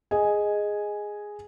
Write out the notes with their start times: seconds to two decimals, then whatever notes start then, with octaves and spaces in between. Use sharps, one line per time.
0.11 G#4 D#5 G#5